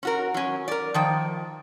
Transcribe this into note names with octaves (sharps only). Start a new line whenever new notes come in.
C#4 F#4 A#4
F#3 C#4
A#4 D5
D#3 F3 G5